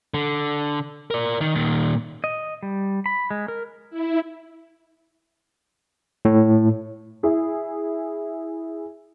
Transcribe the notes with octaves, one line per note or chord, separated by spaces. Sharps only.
D3
A#4 D5
D#3
A#2 D#3
D#5
G3
B5
G#3
A#4
E4
A2
E4 G#4